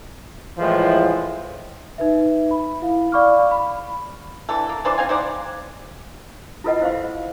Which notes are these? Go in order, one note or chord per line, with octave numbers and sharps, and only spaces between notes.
A2 E3 F3 G#3
D#4 B4 E5
B5
E4 F5
D5 F5 B5 C#6 D6 F6
B5
D3 E3 A4
A#3
E3 D4 C5 D5
C4 F5 G#5
D#4 C5 D5 F#5
E4 F4 A4 B4 D#5 F#5
E4 C5 F5 F#5 C6